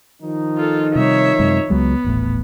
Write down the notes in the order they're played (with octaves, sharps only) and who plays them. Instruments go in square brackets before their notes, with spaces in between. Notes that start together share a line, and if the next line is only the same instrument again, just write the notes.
[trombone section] D#3 F3 D#4
[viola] F4 A4
[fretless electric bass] C3 G3 [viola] C#5 E5
[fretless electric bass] F#2 C3 G#3
[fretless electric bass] C#2 F#3 G#3 [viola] B3
[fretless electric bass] D#1 A1 A2